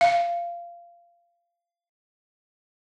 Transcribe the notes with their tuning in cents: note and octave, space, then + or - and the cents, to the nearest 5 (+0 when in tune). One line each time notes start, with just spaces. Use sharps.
F5 -15